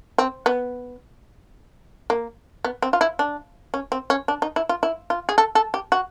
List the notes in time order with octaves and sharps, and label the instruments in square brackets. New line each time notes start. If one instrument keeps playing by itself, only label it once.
[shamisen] C4
B3
A#3
B3
C4
F4
E4
D4
C#4
C4
C#4
D4
D#4
E4
F4
E4
F4
G#4
A4
A4
G4
F#4